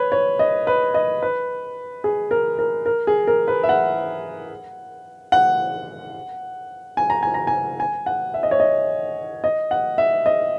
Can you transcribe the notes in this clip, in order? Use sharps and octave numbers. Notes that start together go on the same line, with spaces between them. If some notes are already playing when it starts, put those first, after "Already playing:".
Already playing: B4 C#5
C#5
D#5
B4
D#5
B4
G#4
A#4
A#4
A#4
G#4
A#4
B4
E5
F#5
F#5
G#5
A#5
G#5
A#5
G#5
G#5
F#5
E5
D#5
C#5
D#5
D#5
F#5
E5
D#5